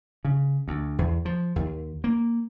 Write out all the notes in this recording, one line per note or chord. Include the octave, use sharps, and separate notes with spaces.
C#3
D2
E2
F3
D#2
A#3